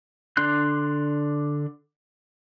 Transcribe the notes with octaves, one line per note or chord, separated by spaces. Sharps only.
D3 D4 C6 F#6